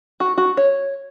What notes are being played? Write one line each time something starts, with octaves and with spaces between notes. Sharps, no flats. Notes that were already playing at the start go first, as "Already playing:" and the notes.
F#4
F#4
C#5